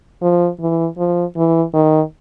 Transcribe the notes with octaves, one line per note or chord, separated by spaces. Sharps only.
F3
E3
F3
E3
D#3